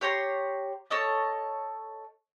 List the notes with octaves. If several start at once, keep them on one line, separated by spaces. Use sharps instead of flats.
G4 C#5 A#5 C6
A4 C#5 D#5 A5